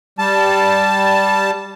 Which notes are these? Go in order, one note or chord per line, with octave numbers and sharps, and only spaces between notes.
G3 A5